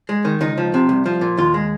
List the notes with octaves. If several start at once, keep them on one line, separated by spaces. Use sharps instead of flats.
G#3
D#3
C#2 D#4
F3
C3
C2
F3
A#2
D#2 F4
G#3